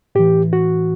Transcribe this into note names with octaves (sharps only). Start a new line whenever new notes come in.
A2 E3 G4
F#4